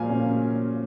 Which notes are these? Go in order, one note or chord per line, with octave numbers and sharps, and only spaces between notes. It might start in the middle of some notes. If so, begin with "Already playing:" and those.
Already playing: A#2 F3 A#3 F5 G#5
C#4